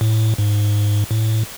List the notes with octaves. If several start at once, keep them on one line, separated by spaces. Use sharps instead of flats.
A2
G#2
A2